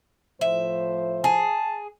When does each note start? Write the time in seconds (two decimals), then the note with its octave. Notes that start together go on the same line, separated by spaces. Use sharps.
0.41 A2 F3 C5 E5
1.24 G#4 A5